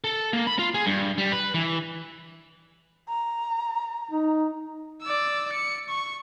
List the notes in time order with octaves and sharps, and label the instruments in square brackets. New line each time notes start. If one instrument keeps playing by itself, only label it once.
[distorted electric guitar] A4
A#3
B5
F4
G#4
G2
G3
B4
E3
[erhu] A#5
[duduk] D#4
[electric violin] D5 E6
C#7
C#6